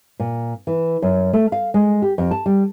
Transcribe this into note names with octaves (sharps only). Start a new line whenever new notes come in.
A#2
E3
F#2
A3
F5
G#3
G4
F2
A5
G3